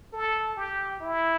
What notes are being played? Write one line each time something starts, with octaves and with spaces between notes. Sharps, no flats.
A4
G4
E4